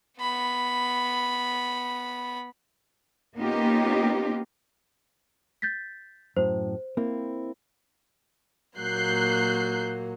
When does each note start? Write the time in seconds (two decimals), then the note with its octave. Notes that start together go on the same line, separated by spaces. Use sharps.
0.19 B3 B5
3.36 A#3 B3 C#4 D#4 F4 G4
5.62 G6 A6 B6
6.37 F#2 A2 C5
6.97 A#3 C4 E4
8.78 A#2 F#3 A#3 F#6 G6 C7